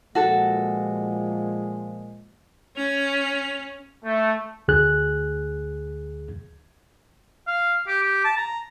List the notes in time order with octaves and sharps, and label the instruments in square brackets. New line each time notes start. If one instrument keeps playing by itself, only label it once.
[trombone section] A#2 F3 G#3 [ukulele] F#4 A4
[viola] C#4 [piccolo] F7
[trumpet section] A3
[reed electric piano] D2 G#4 F#6
[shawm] F5
G4
G4
A5
A#5